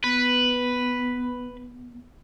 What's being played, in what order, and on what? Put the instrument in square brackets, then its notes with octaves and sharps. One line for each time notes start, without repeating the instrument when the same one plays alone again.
[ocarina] B3 [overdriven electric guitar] B4